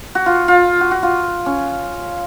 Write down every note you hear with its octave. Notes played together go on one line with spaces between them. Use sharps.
F#4
F4
F4
F#4
F#4
F4
C#4